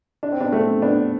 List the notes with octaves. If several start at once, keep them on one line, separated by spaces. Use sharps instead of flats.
D4
C4
B3 D4
A3 C4
B3 D4